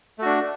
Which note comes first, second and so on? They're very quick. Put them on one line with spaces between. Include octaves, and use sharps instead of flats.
A3 F#4 D4